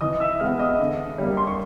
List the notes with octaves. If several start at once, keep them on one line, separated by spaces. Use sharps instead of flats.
E3 D#5 D#6
E5 E6
G#3 B3 F5 F6
D#5 D#6
D3
G3 A#3
C6
C#6